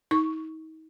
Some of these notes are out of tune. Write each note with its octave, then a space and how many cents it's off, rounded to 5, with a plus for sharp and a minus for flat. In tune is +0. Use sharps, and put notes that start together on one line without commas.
D#4 +35 C#6 +0